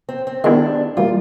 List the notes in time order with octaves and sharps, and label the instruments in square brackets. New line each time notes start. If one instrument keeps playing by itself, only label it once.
[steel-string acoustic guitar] C4
C4
[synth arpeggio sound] D#3 G#3 B3 E4 G4 [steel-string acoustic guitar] D4
[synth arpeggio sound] E3 G3 A#3 [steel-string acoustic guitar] F4